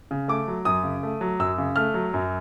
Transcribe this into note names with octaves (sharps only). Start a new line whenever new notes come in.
C#3
A3 D6
F#3
F#2 D#6
C#3
A3
F#3
F#2 E6
C#3
A3 F6
F#3
F#2